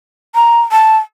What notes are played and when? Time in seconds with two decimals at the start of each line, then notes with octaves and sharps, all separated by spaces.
0.35 A#5
0.72 A5